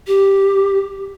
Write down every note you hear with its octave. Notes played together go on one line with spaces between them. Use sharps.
G4